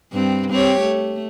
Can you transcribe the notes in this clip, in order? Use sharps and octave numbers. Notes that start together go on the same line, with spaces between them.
G2 C4
C4 G4 C#5
A3